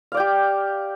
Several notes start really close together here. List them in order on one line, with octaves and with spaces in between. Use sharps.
F5 D5 G5 G4